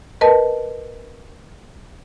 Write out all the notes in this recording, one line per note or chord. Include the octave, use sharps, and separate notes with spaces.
A#4 B4 D#5 A5